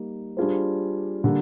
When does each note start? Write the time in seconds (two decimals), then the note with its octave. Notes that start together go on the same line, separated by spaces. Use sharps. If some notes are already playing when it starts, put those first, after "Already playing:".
Already playing: G3 A#3 D#4
0.37 G3 D4 F4 G#4 C5
1.24 D3 G3 A#3